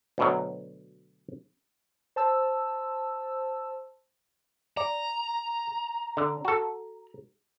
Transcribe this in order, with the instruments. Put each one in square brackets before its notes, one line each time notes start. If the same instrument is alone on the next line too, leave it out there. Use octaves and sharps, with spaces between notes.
[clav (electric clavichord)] D2 B2 F#3
[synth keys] C5 A5 E6
[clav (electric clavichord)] D5 [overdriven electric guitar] A#5
[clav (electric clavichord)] D3
F#4 A4